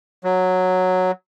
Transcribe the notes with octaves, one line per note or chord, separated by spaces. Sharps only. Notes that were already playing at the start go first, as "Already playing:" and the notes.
F#3